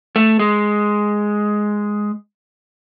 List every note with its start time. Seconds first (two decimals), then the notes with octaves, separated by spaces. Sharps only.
0.16 A3
0.39 G#3